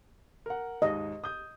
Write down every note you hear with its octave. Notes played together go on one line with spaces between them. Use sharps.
A#4 F#5
D#2 G#2 D#5
D#6 G6